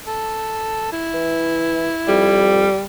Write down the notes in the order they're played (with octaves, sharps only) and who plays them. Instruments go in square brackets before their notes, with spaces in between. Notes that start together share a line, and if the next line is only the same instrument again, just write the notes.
[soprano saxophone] A4
E4
[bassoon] E3
[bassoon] F2 [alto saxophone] G3